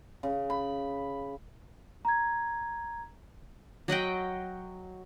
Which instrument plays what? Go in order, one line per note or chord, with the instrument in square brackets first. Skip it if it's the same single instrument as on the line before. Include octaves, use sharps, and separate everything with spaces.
[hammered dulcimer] C#3
B5
[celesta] A#5 G#6
[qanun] F#3 D#5 F#5 G5